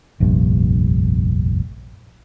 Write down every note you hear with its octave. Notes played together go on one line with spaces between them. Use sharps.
F1 A#1 G2